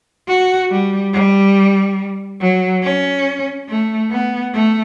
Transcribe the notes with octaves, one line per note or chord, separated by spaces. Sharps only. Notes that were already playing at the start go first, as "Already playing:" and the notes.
F#4
G3
G3
F#3
C#4
A3
B3
A3